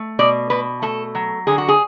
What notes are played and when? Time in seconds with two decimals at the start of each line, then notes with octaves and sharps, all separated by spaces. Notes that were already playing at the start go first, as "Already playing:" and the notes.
Already playing: A3
0.19 B2 D5
0.50 B2 B4
0.82 A3 A4
1.15 F#3
1.47 D3 G#4
1.58 F#4
1.68 G#4